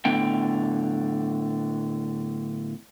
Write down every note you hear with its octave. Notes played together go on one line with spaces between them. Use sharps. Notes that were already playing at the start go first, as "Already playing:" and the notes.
A2 D3 B3 G5